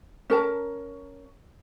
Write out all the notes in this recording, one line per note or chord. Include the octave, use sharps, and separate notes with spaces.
C#4 A#4 A5